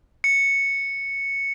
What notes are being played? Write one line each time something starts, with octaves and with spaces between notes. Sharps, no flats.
C#7